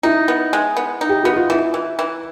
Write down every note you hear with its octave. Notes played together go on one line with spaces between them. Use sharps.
D#4 E4
B3
G#3
B3
D#4
G4
B3 F#4
F4
E3 E4
E3
E3